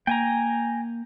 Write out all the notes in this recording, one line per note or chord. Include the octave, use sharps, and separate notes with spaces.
A#3 G5 G#5 A#5